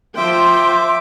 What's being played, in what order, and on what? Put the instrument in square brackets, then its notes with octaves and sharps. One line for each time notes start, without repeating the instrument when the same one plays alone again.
[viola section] F3 C5 G5 [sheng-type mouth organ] E5 D6 [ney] C6